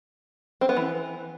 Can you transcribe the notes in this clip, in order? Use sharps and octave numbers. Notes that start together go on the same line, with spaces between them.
C4
B3
E3